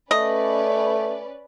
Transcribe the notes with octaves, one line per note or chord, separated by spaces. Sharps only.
A3 C#4 B4 D5 D#5